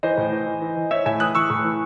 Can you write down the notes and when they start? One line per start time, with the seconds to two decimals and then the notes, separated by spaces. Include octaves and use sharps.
0.03 E3 C5 D#5
0.17 A2
0.32 E3
0.46 E3
0.62 E3
0.76 E3
0.91 E3 C#5 E5
1.06 A2 E5 G#5
1.20 E3 D#6 F#6
1.35 E3 C#6 E6
1.50 A2
1.65 E3